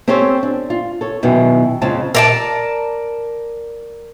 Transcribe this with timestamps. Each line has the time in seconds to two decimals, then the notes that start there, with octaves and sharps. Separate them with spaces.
0.08 C4 C#4 G4 A4 C5 C#5
0.43 D4
0.70 F4
1.01 A4 C#5
1.23 F#2 B2 D#3 E3
1.82 F2 C#3 G#3 C4 A5
2.15 A#4 D5 A5